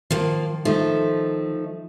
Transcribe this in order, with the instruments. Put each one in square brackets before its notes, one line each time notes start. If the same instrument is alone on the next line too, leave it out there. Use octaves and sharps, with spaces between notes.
[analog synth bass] D#3 [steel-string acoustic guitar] F3 A#3
[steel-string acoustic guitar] F3 A3 D#4